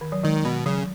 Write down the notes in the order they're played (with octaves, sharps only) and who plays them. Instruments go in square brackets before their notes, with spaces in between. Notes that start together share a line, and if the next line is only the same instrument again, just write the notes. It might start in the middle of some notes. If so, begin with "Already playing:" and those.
[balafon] D#3
F#3
[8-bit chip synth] D#3 [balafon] G#3
[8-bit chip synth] B2 [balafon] D#3
[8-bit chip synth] C#3 [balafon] F#3